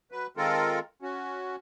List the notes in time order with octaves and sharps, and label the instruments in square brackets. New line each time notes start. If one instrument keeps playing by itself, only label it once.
[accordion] F#3 B4
D#3 G#3 C4 F4 A4 A#4
C#4 F#4